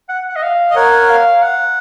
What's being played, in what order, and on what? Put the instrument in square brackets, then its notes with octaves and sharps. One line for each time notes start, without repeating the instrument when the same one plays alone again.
[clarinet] F#5
F#5
D#5
F5
[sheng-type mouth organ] D#5
[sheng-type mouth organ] A#4 C#5 [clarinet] F#5
[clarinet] F5
F#5